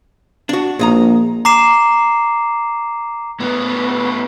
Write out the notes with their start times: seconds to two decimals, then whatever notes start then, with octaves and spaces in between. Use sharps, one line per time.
0.49 D4 F#4
0.79 A#1 G#2 A#3 D#5 A#5
1.45 A#5 D6 C7 E7
3.40 A2 B3